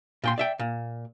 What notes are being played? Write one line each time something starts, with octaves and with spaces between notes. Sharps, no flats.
A#2 G5 C6
D5 E5 G5
A#2